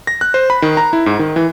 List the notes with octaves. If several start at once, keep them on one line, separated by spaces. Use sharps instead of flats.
A#6
F#6
C5
B5
D#3
A#5
E4
G#2
D#3
E3